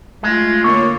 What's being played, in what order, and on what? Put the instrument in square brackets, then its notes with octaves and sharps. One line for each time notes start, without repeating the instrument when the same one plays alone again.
[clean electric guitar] G#3 [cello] A3 F4
[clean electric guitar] D3 [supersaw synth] A#3 C#5 [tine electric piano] C#6